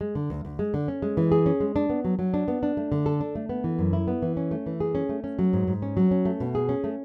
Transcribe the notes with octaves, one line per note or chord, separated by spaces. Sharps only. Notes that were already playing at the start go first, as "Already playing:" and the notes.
G#3
D3
D2
D2
G#3
D3
C#4
G#3
E3
G#4
C#4
G#3
D4
B3
F#3
F#3
D4
B3
D4
A3
D3
A4
D4
A3
B3
E3
F#2
E4
B3
E3
C#4
A3
E3
G#4
C#4
A3
C#4
F#3
G#2
G#2
C#4
F#3
C#4
A3
B2
G#4
C#4
A3